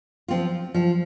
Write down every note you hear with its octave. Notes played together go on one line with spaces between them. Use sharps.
F3 C4 F4
F3